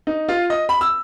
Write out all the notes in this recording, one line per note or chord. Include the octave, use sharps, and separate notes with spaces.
D#4
F4
D#5
B5
E6